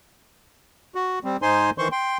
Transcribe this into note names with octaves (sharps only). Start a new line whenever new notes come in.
F#4
G3 C4
G#2 D#4 C5 G#5 C6
D#3 E3 C5 C6 C#6
G5 C6